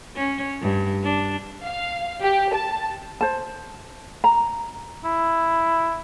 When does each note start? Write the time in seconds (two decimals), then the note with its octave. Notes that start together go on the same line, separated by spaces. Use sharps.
0.16 C#4
0.61 G2
1.03 D4
1.65 F5
2.23 G4
2.54 A5
3.21 C5 A5
4.24 A#5
5.04 E4